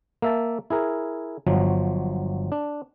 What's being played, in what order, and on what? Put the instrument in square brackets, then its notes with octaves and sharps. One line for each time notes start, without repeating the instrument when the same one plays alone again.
[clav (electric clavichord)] A#3 E5 A5
E4 G#4 A#4
G1 F3 F#3
D4